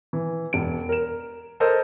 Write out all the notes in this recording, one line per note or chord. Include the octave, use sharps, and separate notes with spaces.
E3
E1 D7
A#4 E7
A4 A#4 C5 D#5